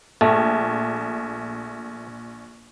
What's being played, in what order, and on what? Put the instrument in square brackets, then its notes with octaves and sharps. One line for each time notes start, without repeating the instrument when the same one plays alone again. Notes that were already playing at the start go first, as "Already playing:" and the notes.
[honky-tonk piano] A#1 [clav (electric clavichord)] A3